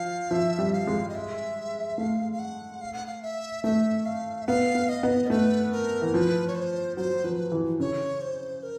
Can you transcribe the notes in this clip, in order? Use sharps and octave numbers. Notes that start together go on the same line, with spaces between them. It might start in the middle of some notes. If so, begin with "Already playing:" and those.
Already playing: F3 F5
F3 E5
G3
F5
G#3
D#5
E5
A3 F5
F5
F#5
F5
F#5
F5
E5
A3 E5
F5
E5
B3 F5
B3
D#5
B3
A#4
A3 B4
A#4
E3
F3 B4
C#5
C5
F#3 C5
F3 B4
E3
C#3 C#5
C5
A#4